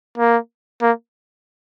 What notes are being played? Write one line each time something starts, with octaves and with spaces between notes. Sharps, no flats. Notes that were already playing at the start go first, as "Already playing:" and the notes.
A#3
A#3